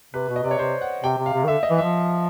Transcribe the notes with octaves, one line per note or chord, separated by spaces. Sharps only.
C3 B4
B2
D#5
C3 D5
C#5
C3 C5
F#5
C3 G5
C3
F5
C3
D#3
D3 E5
D#5
E3
E5
F3